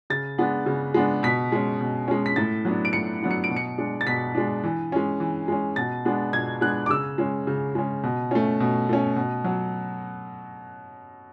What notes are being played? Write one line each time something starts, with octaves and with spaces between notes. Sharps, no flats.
C#3 A6
G#3 B3 D4
C#3
G#3 B3 D4
B2 B6
G#3 C#4
B2
G#3 C#4
B6
A2 A6
F#3 B3 D4
D7
A2 C#7
F#3 B3 D4
C#7
D7
B2
C#7
G#3 D4
A6
B2 B6
G#3 D4
E3
G#3 C#4
E3
G#3 C#4
B2 A6
G#3 B3 D4
B2 G#6
G#3 B3 D4 F#6
D6
C#3 E6
G#3 C#4
C#3
G#3 C#4
B2
A3 C#4
B2
A3 C#4
B2
F#3